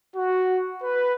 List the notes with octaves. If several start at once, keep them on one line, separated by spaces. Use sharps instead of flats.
F#4
B4